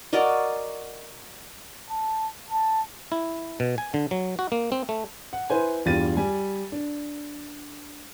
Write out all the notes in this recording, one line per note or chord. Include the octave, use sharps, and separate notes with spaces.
F#4 A#4 D5 D#5
A5
A5
E4
B2
G#5
D3
F#3
F#4
A#3
C4
A3
F#5
E4 B4 C5 G#5
E2 G2 F4 G4 A6 D#7
G3 G#5
D4